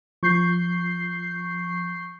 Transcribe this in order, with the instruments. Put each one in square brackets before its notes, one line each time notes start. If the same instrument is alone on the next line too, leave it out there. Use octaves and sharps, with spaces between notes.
[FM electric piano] F3 [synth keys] C#6 G6 C7